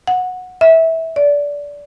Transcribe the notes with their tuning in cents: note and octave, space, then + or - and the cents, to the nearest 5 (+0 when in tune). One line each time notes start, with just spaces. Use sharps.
F#5 -15
E5 -20
D5 -20